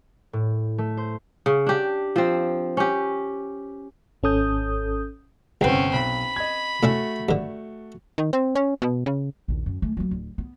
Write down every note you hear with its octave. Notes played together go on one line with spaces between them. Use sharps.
A2
A3
C5
C#3
D4 G4
F3 C4
C#4 G4
G#1 C#4 A4 D#6 G6
G1 C2 C4 C#4 B4 F#5 G5
B1 B5
D#5 G#6
A2 A3 C#4 E4 F#4
G2 D3
D#3
C4
C#4
B2
C#3
A#1 D#2
F#2
G#3 A3
F#3 A#3
D1
B3